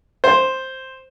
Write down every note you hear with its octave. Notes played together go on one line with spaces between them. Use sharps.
C5